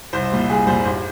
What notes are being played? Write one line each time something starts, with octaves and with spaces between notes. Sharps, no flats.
C2 C5
A#2 G3
C2 G#4
A#2 G3 C5
G#1 C5